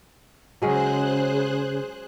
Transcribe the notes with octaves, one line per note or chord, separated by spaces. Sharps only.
C#3 F#3 G#3 C#4 G#4 C5 F#6